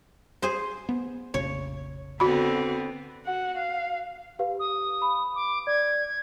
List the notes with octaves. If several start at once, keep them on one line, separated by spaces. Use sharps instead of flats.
G#4 C5
B3
F1 A#1 C#3 C#5
D3 B3 C4 F#4 B5
F#4 F#5
F5
G4 B4 F5
D#6
B5
D6
D5 G#6